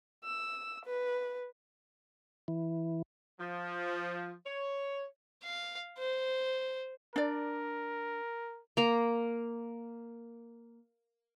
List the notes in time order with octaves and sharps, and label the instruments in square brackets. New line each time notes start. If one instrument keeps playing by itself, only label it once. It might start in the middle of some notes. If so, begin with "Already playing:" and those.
[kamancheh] E6
B4
[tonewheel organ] E3
[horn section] F3
C#5
[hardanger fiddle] F5
C5
[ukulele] D4 D5 [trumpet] A#4
[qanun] A#3 A#5